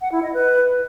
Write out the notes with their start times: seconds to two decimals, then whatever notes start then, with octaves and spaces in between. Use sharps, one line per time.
0.01 F#5
0.12 E4
0.23 D#5
0.33 B4